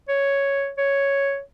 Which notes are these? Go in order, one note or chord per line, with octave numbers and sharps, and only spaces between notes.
C#5
C#5